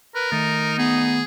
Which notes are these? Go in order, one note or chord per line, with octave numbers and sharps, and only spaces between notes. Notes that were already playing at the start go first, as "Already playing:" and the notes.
A#4 B4
D#3 A3 D#4 A6
B3 G#4